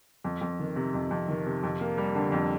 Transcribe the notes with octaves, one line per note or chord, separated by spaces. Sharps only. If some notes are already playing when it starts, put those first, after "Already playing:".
F2
F2
D#3
C3
F2
F2
D#3
C3
F2
A#3
G3
D3
F2